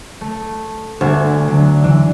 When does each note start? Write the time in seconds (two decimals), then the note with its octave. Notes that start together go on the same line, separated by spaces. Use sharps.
0.21 A3
1.01 D2 E5 G#5
1.47 D3 F#3
1.84 D3 E3